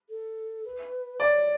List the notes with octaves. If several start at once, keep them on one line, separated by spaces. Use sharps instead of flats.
A4
B4
C#5 D5